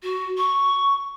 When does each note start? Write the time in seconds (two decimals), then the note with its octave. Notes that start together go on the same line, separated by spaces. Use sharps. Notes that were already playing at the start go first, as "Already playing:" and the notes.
0.03 F#4
0.37 C#6